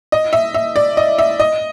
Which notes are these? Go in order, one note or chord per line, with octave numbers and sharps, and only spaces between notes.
D#5
E5
E5
D5
D#5
E5
D#5